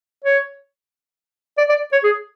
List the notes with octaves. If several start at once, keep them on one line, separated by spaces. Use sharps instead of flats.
C#5
D5
D5
C#5
G#4